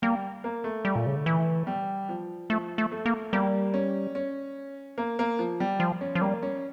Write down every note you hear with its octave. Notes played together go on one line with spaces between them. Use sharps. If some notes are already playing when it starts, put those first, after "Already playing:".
G3 A#3
A#3
A3
G3
A#2
C#3
D3
E3
G3
F3
F3 A3
A3
A3
A#3
G3 A#3
C#4
C#4
A#3
A#3
F3
G3
F3
C#4
F3
G3 A#3
C#4